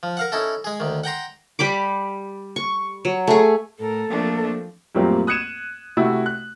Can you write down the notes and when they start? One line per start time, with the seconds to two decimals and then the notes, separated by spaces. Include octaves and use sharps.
0.03 F3
0.17 A#4 F5 F#5
0.32 C#4 D#4 E4 A4
0.64 G#3 G#4
0.80 D2 D#3
1.04 F#5 G5 A#5 C6
1.59 G3 G4 B5 D6
2.56 C#6
3.05 F#3
3.27 A3 G#4
3.79 A2 A4 A#4
4.10 F3 A3 A#3 C4 D4
4.95 F#2 A#2 G3 A3 A#3 C4
5.27 D#6 F#6 G#6 C#7 D#7 E7
5.97 C3 A3 E4 F#4
6.26 F#6